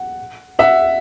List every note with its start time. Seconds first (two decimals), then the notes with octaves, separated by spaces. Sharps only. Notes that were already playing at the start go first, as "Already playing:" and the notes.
Already playing: F#5
0.59 E5 F#5